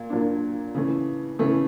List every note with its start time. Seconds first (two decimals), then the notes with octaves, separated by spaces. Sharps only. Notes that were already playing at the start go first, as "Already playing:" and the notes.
Already playing: A#2
0.10 A#2 F#3 A#3 D4
0.75 C#3 E3 A3
1.39 C#3 E3 A3